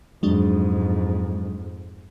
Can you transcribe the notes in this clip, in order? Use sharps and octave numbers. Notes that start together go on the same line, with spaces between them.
F2 G#2 F#3 G#3 D4